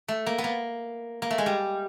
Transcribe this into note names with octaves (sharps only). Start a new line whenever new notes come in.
A3
A#3
B3
A#3
A#3
A3
G#3
G3